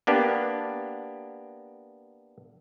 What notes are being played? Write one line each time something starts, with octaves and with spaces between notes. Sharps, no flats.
A#3 B3 D4 G4